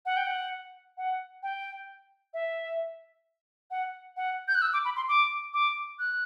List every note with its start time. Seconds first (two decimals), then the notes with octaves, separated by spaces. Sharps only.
0.06 F#5
0.17 G5
0.27 F#5
0.98 F#5
1.43 G5
2.34 E5
3.71 F#5
4.17 F#5
4.48 G6
4.55 F#6
4.62 E6
4.73 D6
4.85 B5
4.96 C6
5.08 D6
5.54 D6
5.99 F#6